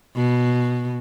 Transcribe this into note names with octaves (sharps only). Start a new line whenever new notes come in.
B2